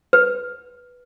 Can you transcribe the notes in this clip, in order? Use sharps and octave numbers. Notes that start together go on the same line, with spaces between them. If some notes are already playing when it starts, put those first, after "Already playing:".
B4